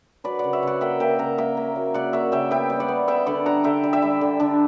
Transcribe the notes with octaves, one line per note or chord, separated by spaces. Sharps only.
F#3 B4 D5
C#3 D5 F#5
C#5 E5
C#3 D5 F#5
A#3 E5 G5
A#3 E5 G5
C#3 F#5 A#5
A#3 E5 G5
A#3
F#3
C#3 D5 F#5
A#3 C#5 E5
C#3 E5 G5
B3 E5 G5
G3
D5 F#5
B3
B3 E5 G5
D3 D5 F#5
G3 F#5 A#5
D3 E5 G5
G3
E5 G5
G3
D3
D3 D4